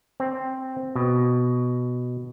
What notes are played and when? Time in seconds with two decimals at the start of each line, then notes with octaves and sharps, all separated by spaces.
0.20 C4
0.95 B2